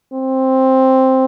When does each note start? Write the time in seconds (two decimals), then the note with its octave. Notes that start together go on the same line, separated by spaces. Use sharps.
0.13 C4